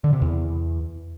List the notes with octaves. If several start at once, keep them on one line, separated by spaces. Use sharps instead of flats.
D3
C3
E2